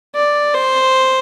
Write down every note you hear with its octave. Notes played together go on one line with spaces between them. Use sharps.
D5
C5